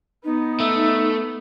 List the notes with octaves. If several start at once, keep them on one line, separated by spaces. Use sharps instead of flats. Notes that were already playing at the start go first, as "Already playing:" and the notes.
B3 D#4
A3 E5